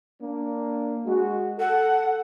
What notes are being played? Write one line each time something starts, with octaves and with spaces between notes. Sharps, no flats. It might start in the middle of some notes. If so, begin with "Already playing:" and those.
A#3 D4
G#3 F#4
A4 F#5